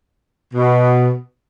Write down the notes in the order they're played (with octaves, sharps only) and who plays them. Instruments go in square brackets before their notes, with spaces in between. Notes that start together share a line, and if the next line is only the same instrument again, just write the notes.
[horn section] B2